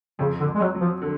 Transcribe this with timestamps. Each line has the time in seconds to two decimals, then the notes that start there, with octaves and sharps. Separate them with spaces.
0.19 F2 C#3
0.39 D3
0.47 F2
0.55 G#3
0.61 F#3
0.75 F#3
0.80 F3
1.02 D3